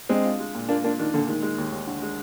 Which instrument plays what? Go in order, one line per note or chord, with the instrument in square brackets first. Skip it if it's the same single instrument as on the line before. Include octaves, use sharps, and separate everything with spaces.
[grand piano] G#3 C4 [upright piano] D4
[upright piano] F4
G#3
A#2
[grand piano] A#3 D4 [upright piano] F4
[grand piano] A#3 D4 [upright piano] F4
[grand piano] D#3 [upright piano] D4
[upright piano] A#2 [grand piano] D3
[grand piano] D#3 [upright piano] G#3
[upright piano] G#3
D#2
D#2
D3
G#3